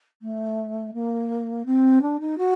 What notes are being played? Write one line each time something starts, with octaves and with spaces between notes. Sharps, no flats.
A3
A#3
C4
D4
D#4
F#4